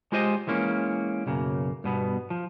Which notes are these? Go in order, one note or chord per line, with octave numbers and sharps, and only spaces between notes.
G#3 F4 G4 C5 D#5
E3 G#3 A#3 C#4
B1 F#2 C#3 A#3
G2 B2 B3
F3